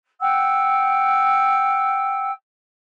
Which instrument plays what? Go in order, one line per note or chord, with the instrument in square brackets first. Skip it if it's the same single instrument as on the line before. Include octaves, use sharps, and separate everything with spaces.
[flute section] F#5 G5 E6